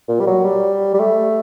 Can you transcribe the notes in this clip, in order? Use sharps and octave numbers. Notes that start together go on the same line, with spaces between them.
A#2
G3
F#3
G3
G3
A3